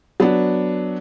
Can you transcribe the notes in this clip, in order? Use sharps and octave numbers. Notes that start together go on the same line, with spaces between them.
F#3 B3 D4